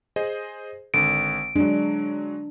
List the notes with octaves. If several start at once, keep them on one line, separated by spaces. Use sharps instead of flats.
G#4 C5 D#5
G#1 D3 D7
F#3 G#3 D4